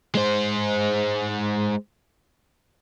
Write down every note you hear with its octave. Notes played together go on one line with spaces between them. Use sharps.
G#3 C5